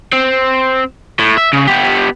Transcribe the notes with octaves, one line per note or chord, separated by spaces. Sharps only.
C4
A2
E5
C#3
B3 G4